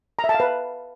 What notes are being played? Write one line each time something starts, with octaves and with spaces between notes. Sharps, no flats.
A#5
E5
A5
F5
B4